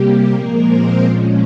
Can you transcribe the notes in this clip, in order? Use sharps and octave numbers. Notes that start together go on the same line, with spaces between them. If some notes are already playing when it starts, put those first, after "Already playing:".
Already playing: C3 G3 A#3 G4
A#2 F3 G#3 A#3 A#4
C4 C5
A#2 F3 G#3 C#4